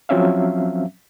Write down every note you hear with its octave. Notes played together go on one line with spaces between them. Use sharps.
F3 F#3 C4 C#4 E5 F5